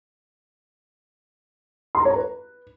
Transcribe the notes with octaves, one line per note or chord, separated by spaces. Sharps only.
C6
A#5
C#5
A#5
B4